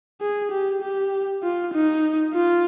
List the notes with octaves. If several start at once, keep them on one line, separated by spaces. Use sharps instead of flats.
G#4
G4
G4
F4
D#4
F4